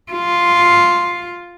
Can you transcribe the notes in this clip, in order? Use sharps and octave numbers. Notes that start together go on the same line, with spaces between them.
F4